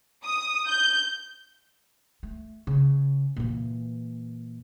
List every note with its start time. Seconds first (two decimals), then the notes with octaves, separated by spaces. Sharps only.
0.24 D#6
0.67 G6
2.23 A3
2.67 C#3
3.36 A#2 E3